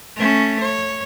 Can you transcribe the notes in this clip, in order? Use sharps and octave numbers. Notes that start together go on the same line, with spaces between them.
A3 C#4
C#5